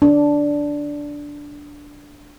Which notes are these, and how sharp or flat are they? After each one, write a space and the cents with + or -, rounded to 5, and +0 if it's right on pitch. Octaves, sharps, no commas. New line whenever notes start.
D4 -5